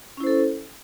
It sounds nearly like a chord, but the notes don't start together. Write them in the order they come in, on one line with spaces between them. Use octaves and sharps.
C#4 E4 C5 A4